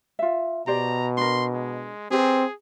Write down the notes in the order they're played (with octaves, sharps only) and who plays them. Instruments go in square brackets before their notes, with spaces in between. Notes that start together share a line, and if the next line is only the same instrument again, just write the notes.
[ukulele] F4 E5
[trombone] B2 [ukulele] G4 C5 D5 [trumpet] A#5
[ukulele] D4 A#4 [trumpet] C6
[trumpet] G#3
[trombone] C4 [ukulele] G4 B4 G#5 [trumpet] G#4